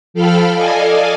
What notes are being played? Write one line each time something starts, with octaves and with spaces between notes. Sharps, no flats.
F3 A4 F5 G5 B5 F6
A4 D5 D#5 F5 G#5